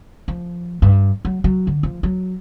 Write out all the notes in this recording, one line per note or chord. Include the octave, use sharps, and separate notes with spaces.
F3
G2
F#3
F#3
D3
F3
F#3